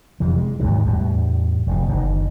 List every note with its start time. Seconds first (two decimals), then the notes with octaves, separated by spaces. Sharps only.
0.20 F2 C3 E3
0.38 G#3
0.60 D#2 G#2 B2 D#3
0.86 E2 A2 G3
1.67 F1 B2
1.88 F#1 A2 D#3